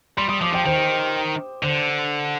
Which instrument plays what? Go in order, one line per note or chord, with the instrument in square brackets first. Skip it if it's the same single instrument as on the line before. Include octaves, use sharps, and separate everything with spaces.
[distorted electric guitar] G3 [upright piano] C6
[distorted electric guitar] G3 [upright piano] D#6
[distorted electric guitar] F3 [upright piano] D6
[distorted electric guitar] F3 [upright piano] G5
[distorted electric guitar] D#3 [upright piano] C5
[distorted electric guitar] D3 [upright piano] C5